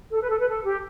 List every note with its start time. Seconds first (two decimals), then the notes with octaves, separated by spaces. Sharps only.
0.12 A4
0.21 B4
0.30 A4
0.40 B4
0.49 A4
0.64 G4